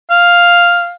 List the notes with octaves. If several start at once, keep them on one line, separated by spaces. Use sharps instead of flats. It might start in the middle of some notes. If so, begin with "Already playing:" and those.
F5